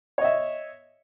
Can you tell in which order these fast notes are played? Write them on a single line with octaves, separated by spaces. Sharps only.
C#5 D#5 E5